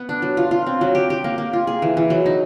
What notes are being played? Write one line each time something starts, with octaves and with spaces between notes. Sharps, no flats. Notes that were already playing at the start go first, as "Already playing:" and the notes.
Already playing: B3
D4
F#3
F4
F4
C4
F#3
G4
G4
A#3
A#3
F4
G#4
E3
E3
F#3
D#4